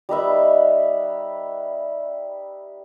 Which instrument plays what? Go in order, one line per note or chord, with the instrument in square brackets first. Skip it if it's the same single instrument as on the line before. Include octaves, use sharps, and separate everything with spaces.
[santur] G3 D#4 B4 E5